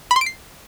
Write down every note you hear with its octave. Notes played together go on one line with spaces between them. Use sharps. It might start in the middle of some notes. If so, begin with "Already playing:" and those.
B5
C6
D7
C7